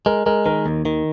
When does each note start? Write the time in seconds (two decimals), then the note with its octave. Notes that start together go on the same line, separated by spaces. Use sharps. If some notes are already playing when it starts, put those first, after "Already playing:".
0.06 G#3 A#4
0.26 G#3 A#4
0.46 D#3 A#4
0.66 D#2
0.85 D#3